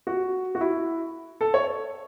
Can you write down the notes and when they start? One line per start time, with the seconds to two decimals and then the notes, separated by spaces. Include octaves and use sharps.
0.07 F#4
0.55 F#4
0.61 E4
1.41 A4
1.54 C#5